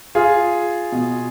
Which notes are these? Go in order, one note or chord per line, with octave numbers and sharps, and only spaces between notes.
F4 G#4
B2